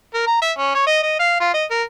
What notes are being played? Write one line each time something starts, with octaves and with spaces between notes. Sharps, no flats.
A#4
A#5
E5
C#4
C#5
D#5
D#5
F5
F4
D#5
A#4